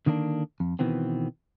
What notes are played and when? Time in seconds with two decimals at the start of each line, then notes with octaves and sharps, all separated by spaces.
0.06 D3 D#3 A#3 B3 D4
0.60 F2
0.79 B2 D#3 E3 B3 C4